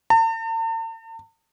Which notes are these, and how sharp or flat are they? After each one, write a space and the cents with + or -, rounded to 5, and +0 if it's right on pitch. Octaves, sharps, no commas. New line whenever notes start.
A5 +45